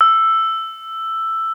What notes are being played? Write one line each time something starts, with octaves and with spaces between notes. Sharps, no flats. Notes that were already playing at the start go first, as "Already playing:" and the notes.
E6